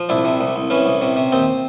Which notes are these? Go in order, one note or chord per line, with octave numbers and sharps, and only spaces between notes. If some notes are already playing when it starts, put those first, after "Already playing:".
Already playing: F3
C2 D4 E4
C3
C2
C2
E3 C#4
C2
C3
C3
D#2 C4